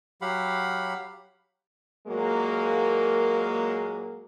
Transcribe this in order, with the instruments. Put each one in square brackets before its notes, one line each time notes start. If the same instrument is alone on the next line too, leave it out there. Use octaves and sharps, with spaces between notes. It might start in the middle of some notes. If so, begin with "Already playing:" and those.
[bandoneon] F#3 G4 F5 F#5 B5
[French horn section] A#2 F#3 G#3 A#3